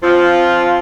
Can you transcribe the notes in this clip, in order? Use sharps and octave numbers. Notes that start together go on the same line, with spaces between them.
F3 C4 F4